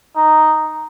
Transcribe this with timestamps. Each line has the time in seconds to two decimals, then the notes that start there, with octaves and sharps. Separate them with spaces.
0.16 D#4